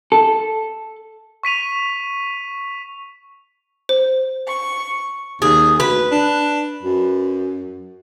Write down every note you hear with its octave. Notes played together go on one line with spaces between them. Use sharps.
A4
C#6 B6 D#7 F7
C5
C#6
D#2 G#4
D2 B4
D4
F#2